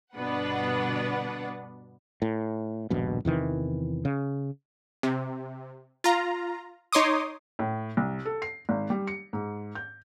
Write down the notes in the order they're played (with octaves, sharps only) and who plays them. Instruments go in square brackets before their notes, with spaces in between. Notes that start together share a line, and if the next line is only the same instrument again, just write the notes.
[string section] G1 B2 B3 D4 B4 F#5
[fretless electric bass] A2
D#1 A#1 G2 B2
E2 C3 D#3 E3
C#3
[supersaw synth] C3
F4 A#5
D#4 C#5 C6 D6 D#6
[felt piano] A2
C2
A4
C7
G#1
G3
C#7
G#2
G6